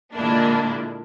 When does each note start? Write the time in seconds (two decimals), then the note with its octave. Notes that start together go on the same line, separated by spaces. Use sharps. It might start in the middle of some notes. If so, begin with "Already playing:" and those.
0.15 A#2 D3 G#3 A#3 D4 E4